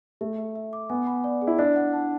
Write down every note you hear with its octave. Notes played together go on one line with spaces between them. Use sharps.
A3 E5
E5
E5
D6
B3 G#5
B5
D5
G#4
E4
D4 D5
F#5
A5